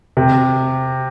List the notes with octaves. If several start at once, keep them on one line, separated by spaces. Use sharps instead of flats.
C3